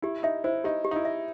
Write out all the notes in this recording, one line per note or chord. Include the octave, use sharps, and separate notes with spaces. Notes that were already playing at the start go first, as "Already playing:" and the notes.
E4 G4
D#4 E5
E4 C5
D#4 G4
G4
D#4
E4
E5